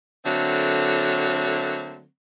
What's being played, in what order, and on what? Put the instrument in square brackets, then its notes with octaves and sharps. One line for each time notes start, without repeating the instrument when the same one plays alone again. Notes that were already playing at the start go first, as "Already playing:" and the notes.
[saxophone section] D3 F#3 A3 A#3 C4